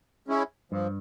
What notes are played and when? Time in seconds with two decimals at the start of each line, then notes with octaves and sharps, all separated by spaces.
0.28 G#3 C#4 E4
0.72 G2 F3